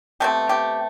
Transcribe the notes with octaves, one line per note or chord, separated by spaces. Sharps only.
B2 A3 C4 G4
G4